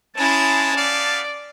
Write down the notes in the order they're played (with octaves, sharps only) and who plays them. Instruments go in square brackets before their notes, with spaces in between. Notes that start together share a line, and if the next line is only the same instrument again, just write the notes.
[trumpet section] G#3 [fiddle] C#4 E4 [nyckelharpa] A5
[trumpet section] B3 G4 F5 [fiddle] D5